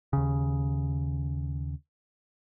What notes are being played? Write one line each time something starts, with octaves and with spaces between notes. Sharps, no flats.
D#2 C#3